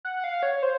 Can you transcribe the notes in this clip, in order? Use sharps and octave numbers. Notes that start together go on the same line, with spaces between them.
F#5
F5
C#5
C5